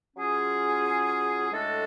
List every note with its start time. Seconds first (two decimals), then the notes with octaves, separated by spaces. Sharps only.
0.16 F#3 C#4 F4 G#4
1.52 A2 G#3 D4 F#4 A4